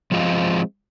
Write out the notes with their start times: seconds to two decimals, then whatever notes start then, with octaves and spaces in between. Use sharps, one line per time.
0.12 F3 G#3 C4 F4 D#5